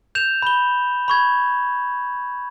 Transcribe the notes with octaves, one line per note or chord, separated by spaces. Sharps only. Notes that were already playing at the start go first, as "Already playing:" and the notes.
G6 E7 F7
B5 G7
B5 C#6 G#6